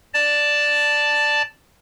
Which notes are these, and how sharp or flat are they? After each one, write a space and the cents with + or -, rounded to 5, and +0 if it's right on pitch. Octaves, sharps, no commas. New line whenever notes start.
D5 +0 A5 +0